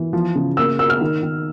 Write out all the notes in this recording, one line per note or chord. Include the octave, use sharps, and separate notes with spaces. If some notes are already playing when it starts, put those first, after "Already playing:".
Already playing: E3
F3
C#3
A#3 E6
A#3 E6
F6
D#3
D#3